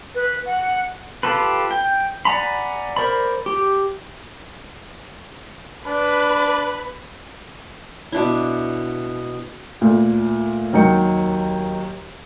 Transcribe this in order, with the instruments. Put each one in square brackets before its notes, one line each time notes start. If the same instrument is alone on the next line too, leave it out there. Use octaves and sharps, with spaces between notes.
[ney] B4
F#5
[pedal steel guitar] F4 G4 A4 B4
G5
D5 F#5 G#5 A#5 B5
A#4 C5 D5 B5
G4
[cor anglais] D4 [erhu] B4
[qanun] B2 D4 E4
[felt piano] D2 A#2
D#2 D#3 F#3 D#4 G5 C#7